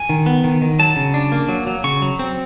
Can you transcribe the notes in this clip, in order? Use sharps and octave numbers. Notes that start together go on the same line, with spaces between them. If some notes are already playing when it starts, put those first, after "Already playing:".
Already playing: G#5
D#3
B3
D#3
D#3
F#3 A5
C#3
D4
A#3
F#3
F#3
C#3 C#6
F#3
C4